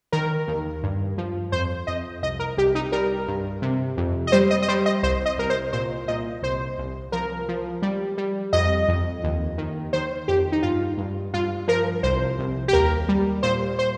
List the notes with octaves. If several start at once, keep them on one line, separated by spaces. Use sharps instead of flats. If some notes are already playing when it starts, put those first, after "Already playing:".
D#3 A#4
D#2
G2
F3
F2 C5
F2 D#5
C2 D#5
A#4
C2 G4
D#4
G3 A#4
G2
C3
F2
D#5
G3 C5
D#5
D#5
G3 C5
D#5
C2 C5
D#5
C2 A#4
C5
A#2 C5
A#2 D#5
C2 C5
C2
F3 A#4
F3
G3
G3
F2 D#5
F2
D#2
D#3
D#3 C5
F2 G4
D#4
G2 F4
G2
G2 F4
F3 A#4
C2 C5
C2
G4
D#2 A#4
G3
A#2 C5
C5